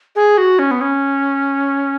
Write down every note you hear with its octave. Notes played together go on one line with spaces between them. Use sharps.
G#4
F#4
C#4
B3
C#4